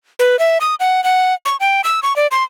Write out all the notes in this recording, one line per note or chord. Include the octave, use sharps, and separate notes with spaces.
B4
E5
D#6
F#5
F#5
C#6
G5
E6
C#6
D5
C6